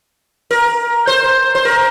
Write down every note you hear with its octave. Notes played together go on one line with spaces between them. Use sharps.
A#4
C5
C5
A#4